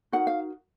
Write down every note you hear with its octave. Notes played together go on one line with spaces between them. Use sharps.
D#4 F#4 A#4 F#5
F5